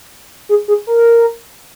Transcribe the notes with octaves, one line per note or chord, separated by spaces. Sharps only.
G#4
G#4
A#4